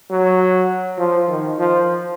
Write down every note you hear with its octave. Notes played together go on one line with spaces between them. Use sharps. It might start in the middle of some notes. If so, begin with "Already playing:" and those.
F#3
F3
D#3
F3